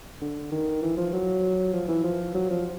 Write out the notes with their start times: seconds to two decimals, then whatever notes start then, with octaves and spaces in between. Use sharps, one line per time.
0.21 D3
0.52 D#3
0.82 E3
0.97 F3
1.13 F#3
1.73 F3
1.88 E3
2.04 F3
2.35 F#3
2.50 F3